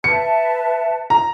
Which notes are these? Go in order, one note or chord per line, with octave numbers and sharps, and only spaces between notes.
B4 E5 A5 C#7
A#5